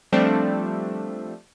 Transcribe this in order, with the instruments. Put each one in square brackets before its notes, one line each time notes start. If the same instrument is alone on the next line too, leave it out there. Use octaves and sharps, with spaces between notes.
[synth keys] F3 G3 A3 C4 D4